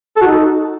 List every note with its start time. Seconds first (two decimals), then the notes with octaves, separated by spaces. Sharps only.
0.16 A4
0.22 F#4
0.27 D#4